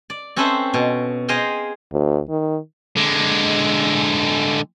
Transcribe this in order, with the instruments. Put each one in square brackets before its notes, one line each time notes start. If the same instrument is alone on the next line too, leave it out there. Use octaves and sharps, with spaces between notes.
[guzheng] D5
C4 C#4 A4 B4 C5 E5
B2
G#4 C5 D#5 F5 G5
[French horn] D2
D#3
[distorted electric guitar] D3 G#3